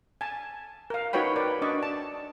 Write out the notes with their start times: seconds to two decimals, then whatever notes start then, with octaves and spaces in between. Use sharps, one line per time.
0.21 G#5 A5
0.90 A#4 F5
1.13 D#4 F#4 B4 C#5 G5 B5
1.36 A#4 B4 D5
1.62 D4 D5 D#5 C#6
1.83 A5